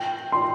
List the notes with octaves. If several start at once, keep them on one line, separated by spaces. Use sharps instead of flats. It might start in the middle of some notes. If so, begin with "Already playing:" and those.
Already playing: G5
C6